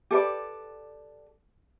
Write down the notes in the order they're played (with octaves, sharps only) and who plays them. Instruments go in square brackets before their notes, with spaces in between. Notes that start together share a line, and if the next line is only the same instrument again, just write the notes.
[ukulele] G4 A4 B4 D5